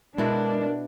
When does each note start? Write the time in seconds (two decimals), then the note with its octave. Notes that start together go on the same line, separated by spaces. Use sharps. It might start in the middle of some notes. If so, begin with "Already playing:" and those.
0.18 B2 G#3 D4 E4 F#4 A#4